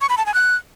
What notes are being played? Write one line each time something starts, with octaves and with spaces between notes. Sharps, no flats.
C#6
B5
A5
G#5
F#6